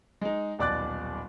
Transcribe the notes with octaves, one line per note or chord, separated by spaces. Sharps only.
G#3 D#4
D#1 B1 D5 D6 F#6 A6